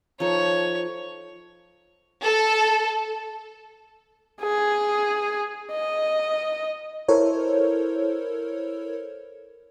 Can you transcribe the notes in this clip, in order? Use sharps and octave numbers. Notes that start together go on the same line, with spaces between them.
F3 D#4 A4 C#5
A4
G#4
D#5
E4 A4 A#4 C5 C#5